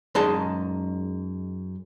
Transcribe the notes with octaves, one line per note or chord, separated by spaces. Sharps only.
F#2 G#3 D#4 G#4 D#5 A5